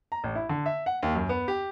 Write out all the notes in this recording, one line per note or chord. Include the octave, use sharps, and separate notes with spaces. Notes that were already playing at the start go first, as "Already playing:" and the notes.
A#5
A1
E4
D3
E5
F#5
D#2
F#2
B3
G4